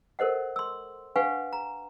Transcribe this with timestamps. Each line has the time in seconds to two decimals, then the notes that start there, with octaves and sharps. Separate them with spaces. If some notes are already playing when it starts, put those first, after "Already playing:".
0.19 A4 A#4 C5 D#5 F#5
0.56 C6 E6
1.16 D4 B4 F5 F#5 G#5 C#6
1.53 A#5